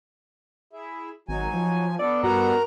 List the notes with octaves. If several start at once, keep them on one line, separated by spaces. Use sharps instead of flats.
E4 G#4 E5
G#1 F#3 D#4 F#4 G#5
F3
B3 D4 A4 D5
G2 F#4 A#4 A#5